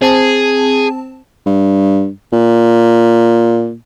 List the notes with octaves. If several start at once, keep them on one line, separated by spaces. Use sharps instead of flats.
C4 G#4 A5
G2
A#2